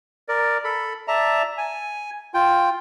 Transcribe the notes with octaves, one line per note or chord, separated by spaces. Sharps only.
A#4 D5
A4 B5
D5 E5 A5 A#5
G#5
F4 G5